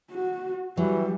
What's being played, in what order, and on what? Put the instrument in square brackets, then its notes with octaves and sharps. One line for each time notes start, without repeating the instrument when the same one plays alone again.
[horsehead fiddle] F#4
[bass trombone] E3 [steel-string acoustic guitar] F#3 [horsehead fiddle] G3